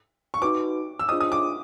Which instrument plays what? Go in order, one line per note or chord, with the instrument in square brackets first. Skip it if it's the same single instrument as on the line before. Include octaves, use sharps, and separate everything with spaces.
[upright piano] C#6
[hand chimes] D#4 F#4 B4 [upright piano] D6
[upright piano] E6
[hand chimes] D4 F4 G#4 C5 D#5 [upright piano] D#6
[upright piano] D#6
D6